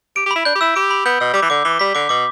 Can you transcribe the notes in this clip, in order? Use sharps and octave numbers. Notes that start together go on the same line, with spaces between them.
G4 D7
G4 B5
E4
D4 G6
G4
E4 E6
G4 D7
B5
B3 G6
B2 E6
G3 D6
E3
D3 D6
E3 G7
G3 B6
D3 D6
B2 D6